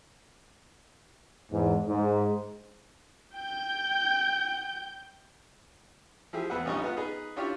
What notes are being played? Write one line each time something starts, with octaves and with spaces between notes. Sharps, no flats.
E2 G#2
G#2
G5 G6
F3 E4 G4 G#4
E2 B4 E5 F#5
A#1 G3 C#4 D#4 C#6 D#6
B3 F4 F#5
D#4 G#4 B4
C#4 D4 E4 F4 G4 C#5